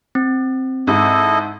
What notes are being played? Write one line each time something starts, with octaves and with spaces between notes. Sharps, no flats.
C4
G#2 E4 A4 D#5